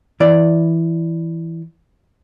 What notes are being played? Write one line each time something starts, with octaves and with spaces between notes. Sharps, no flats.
E3 D5